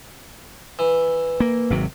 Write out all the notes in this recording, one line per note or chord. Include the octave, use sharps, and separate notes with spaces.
E3
A#3
G#1 C3 F#3